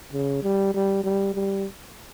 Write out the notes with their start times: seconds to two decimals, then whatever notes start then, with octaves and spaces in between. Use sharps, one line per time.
0.13 C#3
0.43 G3
0.74 G3
1.04 G3
1.34 G3